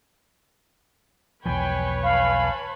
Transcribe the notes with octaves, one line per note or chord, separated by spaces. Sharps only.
B1 E2 F3 B4 C#5 G5 G#5 B5
F5 G#5 A5 B5